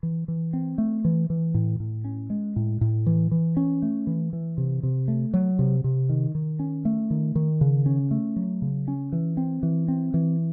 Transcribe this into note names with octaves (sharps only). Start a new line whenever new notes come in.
E3
E3
C4
A3
E3
E3
A2
A2
C#4
G#3
A2
A2
E3
E3
C#4
A3
E3
E3
C3
C3
A3
F#3
C3
C3
D#3
D#3
C#4
A3
D#3
D#3
C#3
C#4
A3
F#3
C#3
C#4
E3
C4
E3
C4
E3